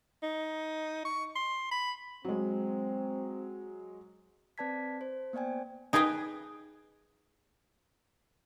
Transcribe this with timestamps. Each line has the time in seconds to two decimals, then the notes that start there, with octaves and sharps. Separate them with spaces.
0.23 D#4
1.05 C#6
1.35 C6
1.71 B5
2.25 F#3 G#3 C4
4.58 C4 B4 D5 A5 G#6 B6
5.01 C5
5.33 A#3 B3 C5 D5 G5 G#5
5.93 D#4 G#4 B4 D#5 G5